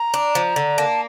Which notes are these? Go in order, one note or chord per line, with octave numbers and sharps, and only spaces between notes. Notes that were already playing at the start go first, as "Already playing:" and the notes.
Already playing: A#5
D4
F3
D3
A#3 A5